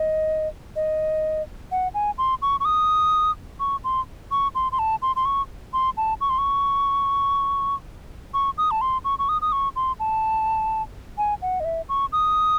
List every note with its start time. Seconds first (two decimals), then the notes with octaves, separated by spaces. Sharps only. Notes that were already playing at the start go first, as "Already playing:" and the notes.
Already playing: D#5
0.76 D#5
1.71 F#5
1.94 G#5
2.18 C6
2.42 C#6
2.60 C#6
2.65 D#6
3.60 C#6
3.84 C6
4.31 C#6
4.55 C6
4.72 C6
4.79 A5
5.02 C6
5.16 C6
5.25 C#6
5.73 C6
5.97 A5
6.21 C#6
6.30 C6
6.38 C#6
8.34 C#6
8.58 D#6
8.71 A5
8.81 C6
9.04 C#6
9.19 C#6
9.29 D#6
9.42 D#6
9.52 C#6
9.76 C6
9.99 A5
11.18 G#5
11.42 F#5
11.60 D#5
11.65 E5
11.89 C#6
12.12 D#6